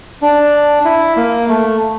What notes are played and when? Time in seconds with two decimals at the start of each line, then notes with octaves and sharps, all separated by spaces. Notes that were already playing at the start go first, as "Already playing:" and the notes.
0.22 D4
0.85 E4
1.17 A#3
1.49 A3